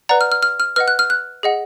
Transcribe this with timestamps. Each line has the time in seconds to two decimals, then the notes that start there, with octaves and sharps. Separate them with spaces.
0.09 B4 D5 F#5 A#5
0.21 F6
0.32 F6
0.43 F6
0.60 F6
0.76 B4 D#5 F#5 F6
0.88 F#6
0.99 F6
1.10 F#6
1.43 G#4 D#5 F#5